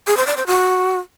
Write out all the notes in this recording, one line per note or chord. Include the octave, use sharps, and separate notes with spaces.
G#4
C5
D5
C5
F#4